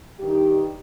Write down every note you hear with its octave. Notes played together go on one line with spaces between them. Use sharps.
G2 D#3 G4